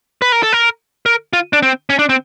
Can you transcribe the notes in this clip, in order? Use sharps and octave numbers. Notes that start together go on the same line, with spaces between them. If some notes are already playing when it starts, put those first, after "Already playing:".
B4
A#4
A4
A#4
A#4
F4
D4
C4
C#4
D4
C4